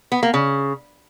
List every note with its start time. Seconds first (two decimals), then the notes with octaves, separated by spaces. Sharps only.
0.12 B3
0.23 A#3
0.34 C#3